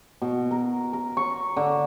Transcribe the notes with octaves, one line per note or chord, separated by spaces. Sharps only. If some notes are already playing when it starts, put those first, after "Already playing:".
B2
A#4
A#4
C#6
D3